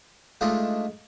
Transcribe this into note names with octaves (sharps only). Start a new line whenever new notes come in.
G#3 A3 D4 D#4 F4 A4